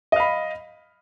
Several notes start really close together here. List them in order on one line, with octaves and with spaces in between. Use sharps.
D#5 F5 B5